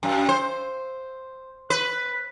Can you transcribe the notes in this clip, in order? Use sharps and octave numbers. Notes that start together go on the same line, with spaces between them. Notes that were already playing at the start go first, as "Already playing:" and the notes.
F#2
C5
B4